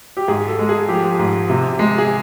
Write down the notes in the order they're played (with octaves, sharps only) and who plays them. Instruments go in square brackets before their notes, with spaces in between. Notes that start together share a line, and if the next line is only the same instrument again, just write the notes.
[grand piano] G4
G#2 G#4
A4
G#3
G#4
F3 G4
G#2
C3
G#3
G#4